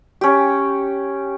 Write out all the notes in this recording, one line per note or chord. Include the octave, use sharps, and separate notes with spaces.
C#4 G4